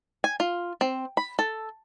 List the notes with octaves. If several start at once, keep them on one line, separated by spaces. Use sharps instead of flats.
G#5
F4
C4
B5
A4